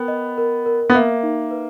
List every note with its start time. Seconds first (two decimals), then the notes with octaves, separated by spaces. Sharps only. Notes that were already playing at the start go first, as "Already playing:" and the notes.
Already playing: B3 A#4 G5
0.08 D#5
0.38 A#4
0.66 A#4
0.90 B3
0.95 A#3 E5
1.23 D#4
1.51 B4